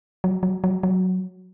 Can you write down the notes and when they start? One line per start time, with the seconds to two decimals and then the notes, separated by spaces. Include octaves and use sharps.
0.24 F#3
0.43 F#3
0.64 F#3
0.83 F#3